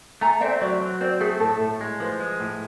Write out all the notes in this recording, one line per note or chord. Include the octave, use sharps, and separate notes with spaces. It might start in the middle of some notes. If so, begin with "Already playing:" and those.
A3 G#5 A#5
C4 D5 E5
F#3 D5 E5
F#3
C4 C5 D5
A3 G#4
A2 A4
A2
G#3
F3 B4
G#3
A2